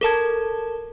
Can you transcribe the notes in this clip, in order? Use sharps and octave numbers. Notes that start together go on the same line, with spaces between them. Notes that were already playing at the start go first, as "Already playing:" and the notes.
A4 A#4 A5 G#6